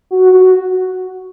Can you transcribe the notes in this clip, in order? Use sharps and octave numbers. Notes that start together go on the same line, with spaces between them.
F#4
F#4